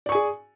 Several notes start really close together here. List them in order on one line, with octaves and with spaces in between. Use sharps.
D5 C#6 G#5 G#4